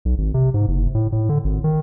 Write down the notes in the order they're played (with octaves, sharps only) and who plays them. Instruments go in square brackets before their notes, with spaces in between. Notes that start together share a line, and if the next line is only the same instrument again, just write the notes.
[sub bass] B1
G#1
C3
G#2
F#1
A2
A2
D3
G#1
D#3